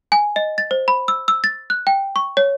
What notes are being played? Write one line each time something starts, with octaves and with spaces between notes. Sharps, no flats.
G#5
D#5
A6
C5
B5
E6
E6
A6
F#6
G5
C#6
C#5